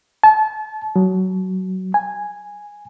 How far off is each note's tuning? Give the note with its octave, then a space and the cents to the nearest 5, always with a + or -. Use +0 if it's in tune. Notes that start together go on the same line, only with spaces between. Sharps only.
A5 -30
F#3 +15
G#5 -5